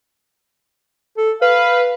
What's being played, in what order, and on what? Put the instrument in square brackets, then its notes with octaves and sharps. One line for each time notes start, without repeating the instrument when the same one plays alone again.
[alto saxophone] A4
[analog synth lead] B4 [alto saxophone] F5